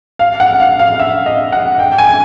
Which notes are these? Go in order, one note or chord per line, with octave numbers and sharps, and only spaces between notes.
F5
F#5
F5
F5
E5
D#5
F#5
G5
G5
G#5